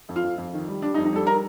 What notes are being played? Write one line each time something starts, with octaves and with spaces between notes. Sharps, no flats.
F2
F4
F2
F2
D#3
G3
G3 D4
D#4
F2
D#4
G3 A4
A#4